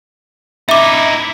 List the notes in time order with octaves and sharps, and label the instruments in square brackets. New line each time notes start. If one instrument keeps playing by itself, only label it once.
[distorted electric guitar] D#4 E4 [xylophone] E5 D6